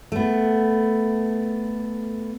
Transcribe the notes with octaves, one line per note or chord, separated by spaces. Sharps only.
A3 B3